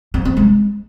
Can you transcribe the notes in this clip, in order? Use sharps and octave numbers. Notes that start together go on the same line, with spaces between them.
C4
C4
G#3